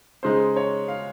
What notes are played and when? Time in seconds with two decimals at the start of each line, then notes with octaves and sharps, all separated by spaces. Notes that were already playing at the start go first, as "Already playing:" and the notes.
0.23 C#3 G#3 D#4 C5
0.56 C#5
0.88 F5